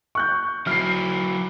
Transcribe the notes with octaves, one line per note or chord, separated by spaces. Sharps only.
C#6 F#6 G6
F#3 E4 F6 C7